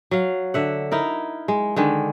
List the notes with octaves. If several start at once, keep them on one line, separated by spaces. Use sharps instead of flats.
F#3 F5
D3 E5 F#5
D#4 E4 A#4
G#3
D3 D#3 G#3